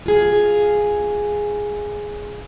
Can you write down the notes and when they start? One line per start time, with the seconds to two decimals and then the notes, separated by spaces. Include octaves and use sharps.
0.06 F4 G#4